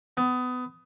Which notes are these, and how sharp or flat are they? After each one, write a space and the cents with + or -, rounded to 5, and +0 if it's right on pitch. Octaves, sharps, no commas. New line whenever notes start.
B3 +25